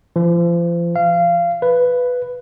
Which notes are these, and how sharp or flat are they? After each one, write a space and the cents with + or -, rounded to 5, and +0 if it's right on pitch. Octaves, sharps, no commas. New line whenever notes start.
F3 -35
F5 -20
B4 +5